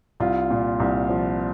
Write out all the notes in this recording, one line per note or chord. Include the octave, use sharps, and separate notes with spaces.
C2 F4
A#2
C2
F3